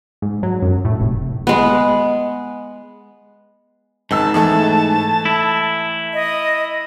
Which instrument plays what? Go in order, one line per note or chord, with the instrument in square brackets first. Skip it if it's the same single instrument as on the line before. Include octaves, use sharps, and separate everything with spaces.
[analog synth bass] G#2
F#3
F#2
A2
F1
[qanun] G#3 B3
[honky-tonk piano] G#1 E6 [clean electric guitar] G#2 [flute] A5
[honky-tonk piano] E3 A3 A4
[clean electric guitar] E4
[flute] D#5